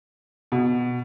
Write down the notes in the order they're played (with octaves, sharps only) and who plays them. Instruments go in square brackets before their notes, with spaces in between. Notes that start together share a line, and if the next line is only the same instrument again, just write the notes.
[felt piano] B2